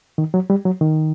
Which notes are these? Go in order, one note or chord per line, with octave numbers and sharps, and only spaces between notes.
D#3
F#3
G3
F#3
D#3